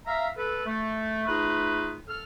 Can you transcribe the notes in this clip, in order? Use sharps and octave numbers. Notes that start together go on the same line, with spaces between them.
E5 F5 A#5
A4 B4
A3
A3 D#4 F4 G#4 B4
A4 F6